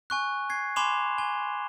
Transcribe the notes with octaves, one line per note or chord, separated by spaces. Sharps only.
G#5 C#6 F#6
G#6 C7
G#5 B5 C6 D6 E7 F7
G#5 G7